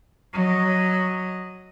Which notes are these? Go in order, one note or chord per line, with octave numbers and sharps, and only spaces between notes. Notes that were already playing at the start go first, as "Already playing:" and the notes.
F#3 D#5